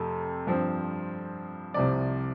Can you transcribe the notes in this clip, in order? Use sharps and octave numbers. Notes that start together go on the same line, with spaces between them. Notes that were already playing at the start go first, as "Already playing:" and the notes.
Already playing: F2 C3 A3
G2 F3 C4
C2 C3 F3 D5